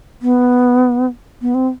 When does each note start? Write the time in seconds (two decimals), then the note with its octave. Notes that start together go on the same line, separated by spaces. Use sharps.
0.22 B3
1.42 B3
1.55 C4